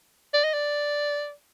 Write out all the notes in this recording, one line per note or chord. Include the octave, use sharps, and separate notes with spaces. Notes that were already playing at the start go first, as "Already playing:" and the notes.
D5
D#5
D5